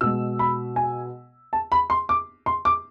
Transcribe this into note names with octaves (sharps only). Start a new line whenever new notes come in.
B2 G#3 E6
B5
G#5
A5
B5
C6
D6
C6
D6